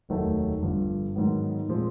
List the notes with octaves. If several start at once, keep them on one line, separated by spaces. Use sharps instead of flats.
F1 D#2 D#3 F#3 A3
G1 G2 D3 F3
G#2 D#3 F#3 B3
A#2 F3 G#3 C4